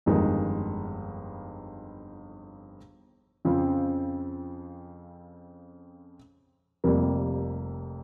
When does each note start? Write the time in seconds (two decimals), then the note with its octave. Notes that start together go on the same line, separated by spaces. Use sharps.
0.06 G1 F2 D#3 G#3 D#4
3.45 F2 C#3 F3 C4
6.84 F1 F2 C3 G3 A#3